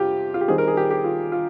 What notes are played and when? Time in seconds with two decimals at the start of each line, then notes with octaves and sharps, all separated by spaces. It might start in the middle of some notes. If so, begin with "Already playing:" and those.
Already playing: F2 C3 G3 F4 G4
0.34 F4
0.41 G4
0.48 D#3 G3 C4 D#4 G#4
0.58 A#4
0.68 G#4
0.77 G4
0.91 G4
1.04 F4
1.32 F4